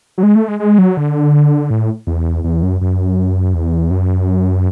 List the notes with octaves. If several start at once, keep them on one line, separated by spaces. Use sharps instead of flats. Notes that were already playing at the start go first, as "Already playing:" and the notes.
F#3
G#3
A3
G#3
G#3
F#3
D3
A2
E2
E2
F#2
F#2
E2
F#2